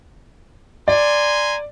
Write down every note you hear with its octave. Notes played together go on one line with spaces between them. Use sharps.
D5 G#5 A#5 C6